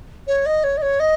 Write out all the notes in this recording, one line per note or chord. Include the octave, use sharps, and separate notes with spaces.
C#5
D#5
C#5
D#5
C#5
D#5